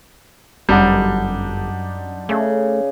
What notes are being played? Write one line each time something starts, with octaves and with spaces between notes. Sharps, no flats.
G1 F#2 G3 D4 D#4 F#5 C6
C#3 A3